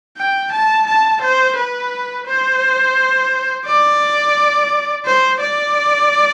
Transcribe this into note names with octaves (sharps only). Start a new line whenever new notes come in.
G5
A5
A5
C5
B4
C5
D5
C5
D5